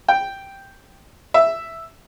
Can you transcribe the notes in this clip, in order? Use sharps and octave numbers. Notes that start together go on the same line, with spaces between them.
G5
E5